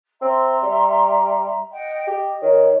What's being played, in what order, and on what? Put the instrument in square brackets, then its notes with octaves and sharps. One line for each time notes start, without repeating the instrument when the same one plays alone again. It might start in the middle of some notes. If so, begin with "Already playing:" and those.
[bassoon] C4 [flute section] E5 A#5 C6
[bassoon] G3
[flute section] D#5 F#5 G5
[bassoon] G4 [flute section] D#5
[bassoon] D#3 [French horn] C#5